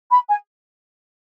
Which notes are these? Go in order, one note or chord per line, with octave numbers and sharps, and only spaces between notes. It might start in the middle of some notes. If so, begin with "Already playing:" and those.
B5
G#5